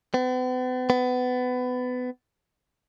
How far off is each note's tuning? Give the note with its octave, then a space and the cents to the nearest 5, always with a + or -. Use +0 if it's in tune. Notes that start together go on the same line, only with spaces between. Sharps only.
B3 +45
B3 +25